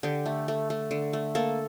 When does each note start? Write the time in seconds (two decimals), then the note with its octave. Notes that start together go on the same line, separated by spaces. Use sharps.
0.03 D3 G4
0.26 A3
0.48 A3
0.70 A3
0.91 D3
1.13 A3
1.35 A#3 A4